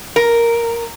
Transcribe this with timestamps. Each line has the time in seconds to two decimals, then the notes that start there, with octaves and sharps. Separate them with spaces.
0.16 A#4